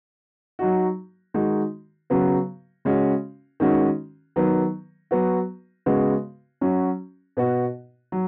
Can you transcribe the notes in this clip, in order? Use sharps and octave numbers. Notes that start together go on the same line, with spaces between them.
F#3 D#4 F#4
D#3 G#3 D#4 F#4
C#3 F#3 B3 F#4
C#3 G#3 C#4 F#4
D#3 G#3 C#4 F#4
D#3 F#3 B3
F#3 B3 F#4
C#3 G#3 B3 F#4
F#3 C#4 F#4
B2 B3 F#4
F#3